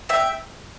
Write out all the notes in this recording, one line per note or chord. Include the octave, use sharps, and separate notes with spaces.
E5 G5